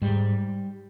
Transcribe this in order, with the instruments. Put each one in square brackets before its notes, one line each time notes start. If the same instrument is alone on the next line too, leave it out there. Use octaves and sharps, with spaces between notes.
[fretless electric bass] G#2 G3